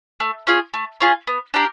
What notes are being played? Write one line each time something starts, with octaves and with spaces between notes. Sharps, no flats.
A3
C#4 F4 G#4
A3
C#4 F4 G#4
B3
D4 G4 A#4